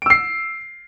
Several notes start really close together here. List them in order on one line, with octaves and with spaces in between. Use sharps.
D7 E6 C7